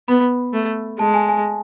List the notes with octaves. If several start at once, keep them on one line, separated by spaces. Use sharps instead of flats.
B3 B5
A3
G#3 A5
G#5
G#5